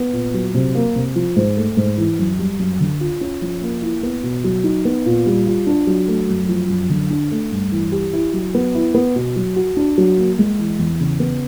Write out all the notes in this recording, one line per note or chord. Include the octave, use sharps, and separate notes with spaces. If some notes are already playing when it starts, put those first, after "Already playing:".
Already playing: B3
A#2
F#3
C3
A#3
C3
F3
G#2
A3
G#2
E3
F#2
G3
F#2
D3
F4
C#4
F3
A#3
E4
B3
B2
F#3
D#4
B3
A#2
G3
F4
D4
F#3
A3
F#2
F3
F#2
D3
D4
A3
G2
E3
G4
E4
F#3
B3
E4
B3
B2
F#3
F#4
D4
F#3
A#3
G#3
E3
E2
C#3
B3